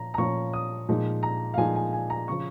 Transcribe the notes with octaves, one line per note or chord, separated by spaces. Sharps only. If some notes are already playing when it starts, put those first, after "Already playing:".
Already playing: A#2 F3 C#4 A#5
A#5
A#2 F3 C#4 C#6
D#6
A#2 F3 G#3 D#4
A#5
F5
A#2 F3 G#3 D#4 G#5
G#5
G#5
A#5
C#3 F3 C#6